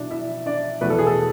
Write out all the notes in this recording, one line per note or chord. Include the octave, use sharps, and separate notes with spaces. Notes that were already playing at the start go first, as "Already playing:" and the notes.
Already playing: B2 F#3 D4 E4 D5
E4 E5
D4 D5
E2 B2 A3 E4 B4
A4
G#4
A4